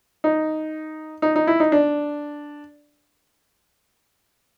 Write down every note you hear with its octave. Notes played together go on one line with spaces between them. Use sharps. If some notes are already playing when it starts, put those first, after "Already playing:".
D#4
D#4
D#4
E4
D#4
D4